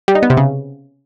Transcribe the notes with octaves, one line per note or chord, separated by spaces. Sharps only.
G3
D#4
B3
C3
C#3